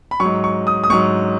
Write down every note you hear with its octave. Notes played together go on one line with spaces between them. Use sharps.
B5
F#3 C#6
G#2
C#6
D#6
D#6
G#2 F#3 C#6